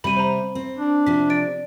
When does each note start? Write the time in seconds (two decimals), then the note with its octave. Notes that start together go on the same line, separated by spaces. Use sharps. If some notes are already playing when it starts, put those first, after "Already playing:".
0.04 C3 G3 B5 D#7
0.16 C5 A#5
0.55 C4
0.78 D4
1.06 C3 F3 B6
1.30 D5 A6 D7